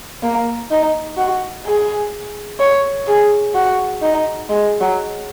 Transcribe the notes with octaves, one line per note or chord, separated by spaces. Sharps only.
A#3
D#4
F#4
G#4
C#5
G#4
F#4
D#4
G#3
F#3